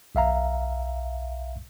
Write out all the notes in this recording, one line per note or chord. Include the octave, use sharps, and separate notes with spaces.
B1 E5 F5 A#5